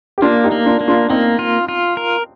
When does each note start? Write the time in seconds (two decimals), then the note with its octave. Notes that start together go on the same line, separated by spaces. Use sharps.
0.18 G4
0.22 A#3 D4 F4
0.44 D#4 G4
0.52 A#3
0.66 D4 F4
0.81 A#3
0.88 D4 F4
1.10 A#3 C4 D#4
1.39 F4
1.69 F4
1.97 A#4